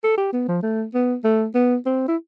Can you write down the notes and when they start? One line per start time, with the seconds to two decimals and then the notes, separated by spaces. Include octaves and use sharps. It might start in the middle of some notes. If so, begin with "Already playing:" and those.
0.04 A4
0.18 G4
0.33 B3
0.48 F3
0.63 A3
0.94 B3
1.24 A3
1.55 B3
1.86 C4
2.08 E4